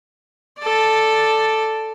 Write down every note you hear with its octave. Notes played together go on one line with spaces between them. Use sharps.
A4 D5